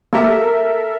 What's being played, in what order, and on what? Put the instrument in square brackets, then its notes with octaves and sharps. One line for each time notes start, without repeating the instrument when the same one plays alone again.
[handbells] A#3 G4 [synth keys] A4 A#4 E5